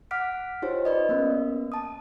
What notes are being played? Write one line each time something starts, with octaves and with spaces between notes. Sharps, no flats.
F#5 D6 F6 B6 D7
D#4 F4 G4 C5 C#5
B4 D5 D#5
A#3 B3 C#4 A#4
A5 D#6